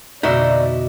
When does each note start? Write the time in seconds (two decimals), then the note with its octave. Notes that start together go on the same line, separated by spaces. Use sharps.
0.23 F2 B2 D3 D#4 F#4 D5 E5